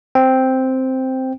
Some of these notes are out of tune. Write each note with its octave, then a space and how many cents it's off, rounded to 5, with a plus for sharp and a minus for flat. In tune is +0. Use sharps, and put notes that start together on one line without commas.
C4 +0 G5 +0